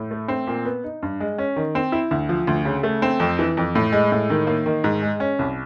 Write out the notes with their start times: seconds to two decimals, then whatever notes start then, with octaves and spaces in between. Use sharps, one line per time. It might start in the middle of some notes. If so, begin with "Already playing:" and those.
Already playing: A2
0.11 A3
0.28 C4
0.47 A#2
0.65 B3
0.84 D#4
1.02 G2
1.20 G#3
1.38 C#4
1.56 D#3
1.75 C4
1.92 E4
2.11 D2
2.29 F3
2.47 D2
2.65 C#3
2.83 A3
3.02 C4
3.20 F2
3.39 E3
3.57 F2
3.75 A2
3.92 G#3
4.12 A2
4.30 D#3
4.47 A#3
4.66 D#3
4.84 G#2
5.03 G#3
5.20 C#4
5.39 C2